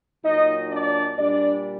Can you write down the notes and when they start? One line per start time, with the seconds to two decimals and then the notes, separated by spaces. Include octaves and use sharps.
0.23 A#2 F#3 D#4 D#5
0.70 D4 D5
1.17 A#2 G3 D4 D5